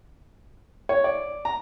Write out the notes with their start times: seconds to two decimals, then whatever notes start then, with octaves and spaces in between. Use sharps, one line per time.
0.89 C#5
1.04 D5
1.45 A#5